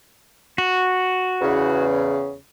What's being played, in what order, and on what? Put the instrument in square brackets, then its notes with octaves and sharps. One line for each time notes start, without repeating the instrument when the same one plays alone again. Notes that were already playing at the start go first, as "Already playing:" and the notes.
[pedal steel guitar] F#4
[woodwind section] E2 C#3